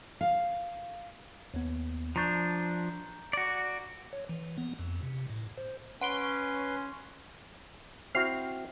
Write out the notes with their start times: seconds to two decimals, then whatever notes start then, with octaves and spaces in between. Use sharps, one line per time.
0.21 F5
1.54 D#2 B3
2.16 F3 D4 A#5 C#6 G6
3.33 F#4 D5
4.13 C#5
4.29 E3
4.58 B3
4.79 F2
5.03 C3
5.30 A2
5.58 C5
6.01 C#4 B4 F#5 C6 D7 G7
8.15 C4 E4 F#4 F6 C7